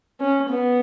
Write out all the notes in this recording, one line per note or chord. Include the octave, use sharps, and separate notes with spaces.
C#4
B3